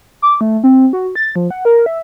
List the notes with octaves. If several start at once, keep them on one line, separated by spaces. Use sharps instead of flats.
D6
A3
C4
F#4
A6
F3
F#5
A#4
E5